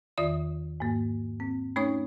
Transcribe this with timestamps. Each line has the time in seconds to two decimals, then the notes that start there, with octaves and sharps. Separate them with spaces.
0.18 E2 D#3 F4 D5 D#6
0.80 G#2 A#3
1.40 C4
1.76 A3 C#4 D#4 C#5 D#6